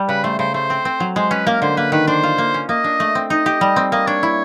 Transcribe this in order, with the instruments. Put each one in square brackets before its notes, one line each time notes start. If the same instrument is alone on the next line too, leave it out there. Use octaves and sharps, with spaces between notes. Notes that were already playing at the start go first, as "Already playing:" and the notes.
Already playing: [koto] G3
[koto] C#3 [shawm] B4
[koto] A3 [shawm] C5
[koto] C#3 [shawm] C5
[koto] A3 [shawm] C5
[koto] C4
C4
F#3
[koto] G#3 [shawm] C5
[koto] C#4 [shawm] B4
[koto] A#3 [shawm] A#4
[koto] D3 [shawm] C5
[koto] A#3 [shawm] B4
[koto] D#3 [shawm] B4
[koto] D4 [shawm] C5
[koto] F4
A#3
C#4
[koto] A#3 [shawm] D#5
[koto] D4
A3
C4
[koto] D#4 [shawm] D#5
[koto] G4
G3
C4
[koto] A#3 [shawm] D#5
[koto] D4 [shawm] C#5
[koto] E4